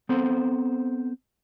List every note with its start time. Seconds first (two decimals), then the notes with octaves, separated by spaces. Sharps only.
0.09 B3 C4 A4 C5